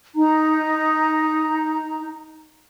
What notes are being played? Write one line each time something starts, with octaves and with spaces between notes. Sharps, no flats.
D#4 A#5